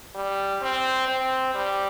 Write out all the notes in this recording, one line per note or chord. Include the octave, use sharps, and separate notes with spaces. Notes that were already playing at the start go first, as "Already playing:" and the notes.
G3
C4
C4
G3